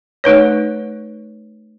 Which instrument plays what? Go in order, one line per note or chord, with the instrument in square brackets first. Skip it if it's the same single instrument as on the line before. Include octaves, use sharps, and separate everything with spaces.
[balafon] A3 D#4 B4 C#5